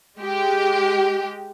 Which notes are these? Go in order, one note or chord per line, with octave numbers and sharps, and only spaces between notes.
G#3 G4